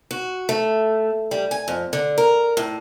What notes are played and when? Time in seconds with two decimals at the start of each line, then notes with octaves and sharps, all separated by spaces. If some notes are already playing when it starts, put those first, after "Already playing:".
0.11 F#4
0.49 A3
1.31 G3
1.51 G#5
1.68 F2
1.93 D3
2.18 A#4
2.57 A2